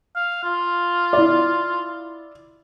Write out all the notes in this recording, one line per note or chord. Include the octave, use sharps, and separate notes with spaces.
F5
F4
E4 D5